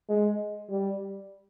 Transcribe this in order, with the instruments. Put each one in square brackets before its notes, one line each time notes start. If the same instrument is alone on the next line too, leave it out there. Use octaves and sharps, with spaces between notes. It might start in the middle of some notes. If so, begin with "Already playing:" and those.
[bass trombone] G#3
G3